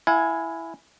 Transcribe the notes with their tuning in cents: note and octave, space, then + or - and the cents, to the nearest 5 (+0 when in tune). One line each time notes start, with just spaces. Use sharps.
E4 +5 F5 +40 G#5 +0